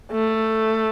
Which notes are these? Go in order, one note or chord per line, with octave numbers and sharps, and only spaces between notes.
A3